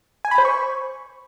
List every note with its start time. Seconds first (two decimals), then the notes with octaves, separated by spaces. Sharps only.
0.25 G#5
0.31 B5
0.38 C5
0.45 C#6